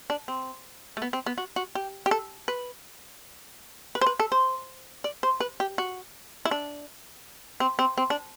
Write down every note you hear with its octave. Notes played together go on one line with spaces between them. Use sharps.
D4
C4
A3
B3
C4
B3
F#4
F#4
G4
G4
A4
B4
B4
C5
B4
A4
C5
D5
C5
B4
G4
F#4
E4
D4
C4
C4
C4
D4